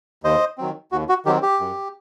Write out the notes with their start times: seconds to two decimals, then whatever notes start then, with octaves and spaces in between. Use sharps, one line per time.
0.24 D#2 C5 D#5
0.58 D#3 F#3 C4
0.92 D#2 F#4
1.09 F#4
1.25 D#3 F#3 C4 G4
1.43 G4
1.60 F#2